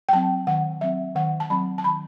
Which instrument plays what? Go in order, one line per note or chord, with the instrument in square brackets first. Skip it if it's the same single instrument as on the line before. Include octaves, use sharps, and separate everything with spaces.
[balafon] G5
F#3 C4 A5
D#3 F#5
F#3 C4 E5
D#3 F#5
A5
F#3 C4 B5
A5
D#3 B5